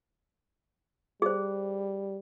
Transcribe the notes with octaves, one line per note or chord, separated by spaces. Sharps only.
G3 G#4 C5